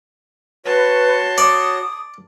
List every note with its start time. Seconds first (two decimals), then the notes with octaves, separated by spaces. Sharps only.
0.65 F#4 B4 C#5 A5 C6 C#6
1.38 D5 D#6